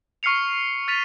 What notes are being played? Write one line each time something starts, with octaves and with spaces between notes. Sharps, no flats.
C#6 F6 C7 C#7 F7
F6 A6 B6 D#7 F7